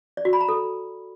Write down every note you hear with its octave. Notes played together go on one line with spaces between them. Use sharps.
D5
F#4
B5
A#5
A4